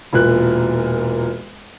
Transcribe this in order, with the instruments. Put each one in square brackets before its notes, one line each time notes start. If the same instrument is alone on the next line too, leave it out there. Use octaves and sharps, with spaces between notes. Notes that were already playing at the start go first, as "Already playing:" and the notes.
[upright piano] E1 A#2 F#6